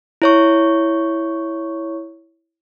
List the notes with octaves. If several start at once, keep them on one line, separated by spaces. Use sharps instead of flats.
E4 C#5 C#6